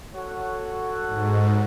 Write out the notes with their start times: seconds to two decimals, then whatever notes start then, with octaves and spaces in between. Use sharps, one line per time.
0.15 F#4 A4 C#5 F#5
1.07 G#2